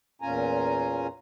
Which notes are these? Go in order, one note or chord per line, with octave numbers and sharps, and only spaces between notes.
E2 A#2 C#4 F4 G#5 A#5